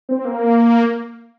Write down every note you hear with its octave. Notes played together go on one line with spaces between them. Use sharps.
C4
A#3